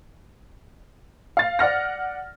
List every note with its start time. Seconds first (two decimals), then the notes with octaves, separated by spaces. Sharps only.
1.37 F5 A6
1.59 D5 F#5 F6 A#6